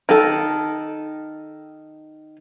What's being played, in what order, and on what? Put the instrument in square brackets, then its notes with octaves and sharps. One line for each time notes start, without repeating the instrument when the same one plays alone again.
[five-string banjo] D#3 A4